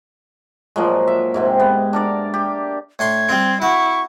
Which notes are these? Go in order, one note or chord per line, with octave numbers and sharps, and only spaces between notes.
A#2 F3 F#3 G#3
E5
G#2 C3 C4
B3
D4 A#4 D5
G4
A2 D4 C6 G#6
G3 C4 F4
E4 F#4 C#6